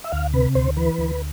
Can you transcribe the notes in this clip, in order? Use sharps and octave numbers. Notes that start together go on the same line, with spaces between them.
E5
D2 F5
C3 B4
D2 C5
E3 B4
D2